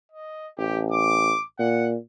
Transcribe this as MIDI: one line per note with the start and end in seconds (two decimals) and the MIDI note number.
0.12 0.47 75
0.58 1.32 33
0.58 0.81 67
0.92 1.43 86
1.59 1.96 46
1.59 1.88 78